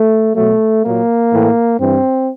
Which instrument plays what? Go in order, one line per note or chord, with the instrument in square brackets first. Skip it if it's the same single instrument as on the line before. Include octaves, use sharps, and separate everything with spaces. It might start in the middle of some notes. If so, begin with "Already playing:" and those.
Already playing: [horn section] A3
B2 F#3 A3
A#2 F#3 A#3
A2 E3
G2 E3 C4